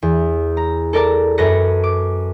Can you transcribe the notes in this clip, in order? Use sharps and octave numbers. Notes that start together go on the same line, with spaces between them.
E2
A#5
A4 A#4 D5 A5 A#5
F#2 A4 B4 F#6 A#6 C#7
D6